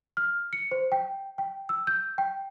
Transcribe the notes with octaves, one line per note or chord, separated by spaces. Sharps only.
F6
C#7
C5
G5
G5
E6
G6
G5